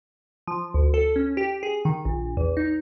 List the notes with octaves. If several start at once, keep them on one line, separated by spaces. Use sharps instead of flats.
F3
D2
A4
C#4
G4
G#4
D#3
A#1
E2
D#4